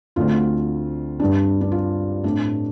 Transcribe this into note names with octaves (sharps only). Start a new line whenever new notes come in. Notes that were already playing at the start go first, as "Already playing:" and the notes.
D2 D3 A3 C4 F4
G2 G3 C4 D4
D4
F4
A2 A3 C4 D4